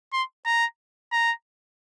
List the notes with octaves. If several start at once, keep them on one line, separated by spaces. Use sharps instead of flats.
C6
A#5
A#5